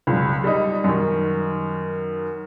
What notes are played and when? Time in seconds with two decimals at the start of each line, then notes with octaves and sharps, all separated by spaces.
0.07 C#2 F#2
0.44 G3 D#4
0.84 F#2 D#3